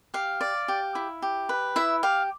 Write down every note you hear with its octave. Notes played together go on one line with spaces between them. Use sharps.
G4 F5
D5
G4
E4
G4
B4
E4 E5
G4 F5